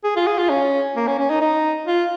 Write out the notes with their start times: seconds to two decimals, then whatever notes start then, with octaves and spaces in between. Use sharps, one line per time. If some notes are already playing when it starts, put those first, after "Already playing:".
0.04 G#4
0.16 F4
0.27 G#4
0.38 F4
0.49 C#4
0.96 A#3
1.07 C#4
1.19 C#4
1.30 D#4
1.41 D#4
1.87 F4